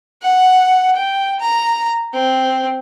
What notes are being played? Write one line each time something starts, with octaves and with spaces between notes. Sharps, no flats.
F#5
G5
A#5
C4